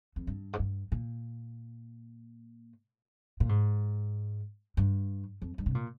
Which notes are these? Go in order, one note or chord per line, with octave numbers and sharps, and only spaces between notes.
F2
G2
G#2
G2
A#2
A#2
G#2
G2
F2
G2
C3
A#2